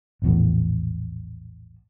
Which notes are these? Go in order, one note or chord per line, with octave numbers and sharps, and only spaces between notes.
A#1 E2 A2